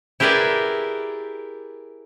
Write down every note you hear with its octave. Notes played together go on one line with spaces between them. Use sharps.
E4 G4 G#4 A#4 B4 D5